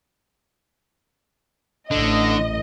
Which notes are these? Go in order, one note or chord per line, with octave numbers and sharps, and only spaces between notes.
A1 D3 D#5